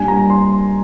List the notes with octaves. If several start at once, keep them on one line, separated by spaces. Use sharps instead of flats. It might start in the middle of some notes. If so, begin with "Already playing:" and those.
Already playing: A#2 G3 D4 G#5
A#5
C6